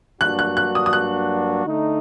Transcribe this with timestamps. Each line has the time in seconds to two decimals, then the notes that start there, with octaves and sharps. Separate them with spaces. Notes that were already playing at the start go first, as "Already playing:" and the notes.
0.21 G2 F#3 A#3 D4 F#4 F#6
0.39 F#6
0.57 F#6
0.75 D#6
0.86 D#6
0.93 F#6
1.66 D3 A3 D#4